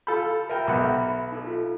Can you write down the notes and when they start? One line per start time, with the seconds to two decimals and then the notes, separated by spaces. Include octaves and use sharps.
0.07 F4 A4 B5 G6
0.49 A#4 E5 G5 A#5 B5
0.67 B1 F#5
1.32 D#4 A4
1.47 F4